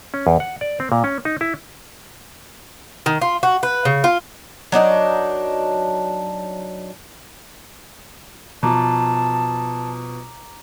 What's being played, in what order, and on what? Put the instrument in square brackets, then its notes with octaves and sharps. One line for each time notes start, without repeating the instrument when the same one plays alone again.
[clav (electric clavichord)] C#4
E2
F#5
D5
C4
A#2
C#4
D#4
E4
[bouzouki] D#3
F4
F#4
B4
C#3
F4
F#3 D4 D#4 A#4
[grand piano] B2 F3 [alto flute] A5 [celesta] A#5 D6